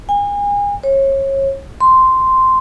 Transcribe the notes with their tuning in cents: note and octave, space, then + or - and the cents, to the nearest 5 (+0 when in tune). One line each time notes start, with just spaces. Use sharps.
G#5 -35
C#5 -30
C6 -5